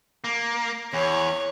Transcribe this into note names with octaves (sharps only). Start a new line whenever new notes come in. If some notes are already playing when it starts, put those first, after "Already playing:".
A#3
E2 C#5